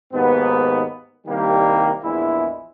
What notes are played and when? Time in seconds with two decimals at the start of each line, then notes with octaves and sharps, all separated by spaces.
0.13 D#2 G#2 B2 B3
1.27 C2 D#3 G3 A#3 G4
2.03 A#1 E2 G#3 E4